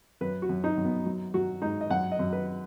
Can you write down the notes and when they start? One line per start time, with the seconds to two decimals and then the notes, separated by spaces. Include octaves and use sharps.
0.21 F#2 B4
0.42 F#4
0.49 F#2
0.64 D#4
0.77 F#2
0.85 B3
1.06 F#3
1.34 F#3 F#4
1.62 G#2 D#4
1.81 D#5
1.90 F#2 F#5
2.12 D#5
2.19 F#2
2.33 B4